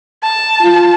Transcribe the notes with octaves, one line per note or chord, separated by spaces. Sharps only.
A5
F4